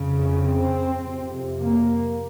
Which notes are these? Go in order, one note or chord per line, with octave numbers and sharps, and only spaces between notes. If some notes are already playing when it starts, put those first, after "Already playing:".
Already playing: F2 C#3
C4
F2 C3
A#3